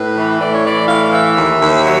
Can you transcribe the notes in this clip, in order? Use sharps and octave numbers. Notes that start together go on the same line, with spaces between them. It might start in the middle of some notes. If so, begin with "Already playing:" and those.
Already playing: A2 B4
E3
A2 D5
C#5
E3 D5
A2 F5
E3 E5
D#2
D#2
F#3